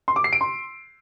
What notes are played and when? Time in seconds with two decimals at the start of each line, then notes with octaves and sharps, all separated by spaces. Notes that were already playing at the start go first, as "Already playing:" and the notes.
0.08 C6
0.16 D6
0.24 C7
0.33 D7
0.41 C6